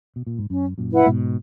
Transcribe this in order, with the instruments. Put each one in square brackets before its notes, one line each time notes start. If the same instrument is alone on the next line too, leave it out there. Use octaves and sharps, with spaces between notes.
[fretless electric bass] B2
A#2
G#2
[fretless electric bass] F#2 [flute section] C#4
[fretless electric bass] F#2 A#2
[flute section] E4 B4 F#5
[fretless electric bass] G#2 B2